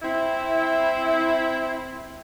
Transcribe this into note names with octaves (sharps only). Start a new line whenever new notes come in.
C4 E4